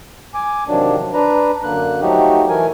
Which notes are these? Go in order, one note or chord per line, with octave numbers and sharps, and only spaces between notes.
G#5 D6
C3 D#3 F3 F#3 D4
D4 B4 A#5
F#2 D3 A#3 F#6
F3 F#3 A3 D#4 F#4 G4
E3 A3 A#4 G#5